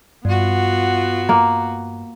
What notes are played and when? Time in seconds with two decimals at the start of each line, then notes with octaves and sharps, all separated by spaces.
0.25 G2 B3 F4 F#4
1.29 A#3